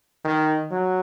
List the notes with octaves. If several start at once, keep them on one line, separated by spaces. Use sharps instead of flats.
D#3
F#3